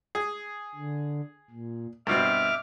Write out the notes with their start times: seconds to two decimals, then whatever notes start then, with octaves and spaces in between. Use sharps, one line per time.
0.15 G#4
0.75 D3
1.50 A#2
2.07 G2 B2 C4 E5 D6 F6